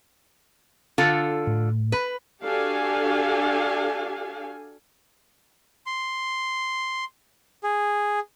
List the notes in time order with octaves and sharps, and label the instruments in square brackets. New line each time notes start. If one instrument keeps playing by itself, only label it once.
[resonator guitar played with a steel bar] D3 F4 A4
[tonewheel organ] A2
[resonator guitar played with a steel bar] B4
[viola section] D4 F#4 G4 A4 F5 G#5
[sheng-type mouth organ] C6
G#4